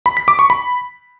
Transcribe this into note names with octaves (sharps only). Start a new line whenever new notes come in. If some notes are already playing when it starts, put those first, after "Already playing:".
B5
B6
D6
C#6
B5